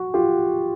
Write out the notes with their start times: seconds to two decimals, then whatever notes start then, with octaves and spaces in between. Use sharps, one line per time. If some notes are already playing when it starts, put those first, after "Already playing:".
Already playing: F#4
0.14 F4 G4